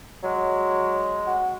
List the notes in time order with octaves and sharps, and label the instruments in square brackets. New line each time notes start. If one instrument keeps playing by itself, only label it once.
[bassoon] F#3 [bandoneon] G#3
[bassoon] F#4